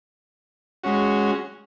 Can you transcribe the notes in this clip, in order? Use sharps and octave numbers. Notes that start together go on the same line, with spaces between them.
G#3 C#4 F#4